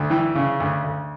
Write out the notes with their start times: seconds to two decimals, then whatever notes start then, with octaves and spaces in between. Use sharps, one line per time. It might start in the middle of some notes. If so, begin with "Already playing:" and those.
Already playing: D2
0.10 E3 G5
0.35 C#3
0.60 D2
0.84 D2